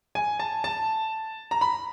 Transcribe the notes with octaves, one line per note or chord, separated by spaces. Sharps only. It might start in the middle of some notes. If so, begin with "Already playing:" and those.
G#5
A5
A5
A#5
B5